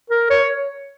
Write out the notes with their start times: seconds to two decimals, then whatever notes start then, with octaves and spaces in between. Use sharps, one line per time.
0.10 A#4
0.30 C#5